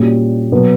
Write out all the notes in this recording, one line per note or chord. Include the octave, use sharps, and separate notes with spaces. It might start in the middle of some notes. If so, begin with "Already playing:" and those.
Already playing: A#2 G3 C#4 F#4
B2 F#3 B3 F#4